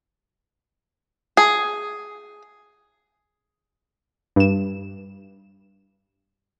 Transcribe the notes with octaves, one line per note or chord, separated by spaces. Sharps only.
G#4
G2 E7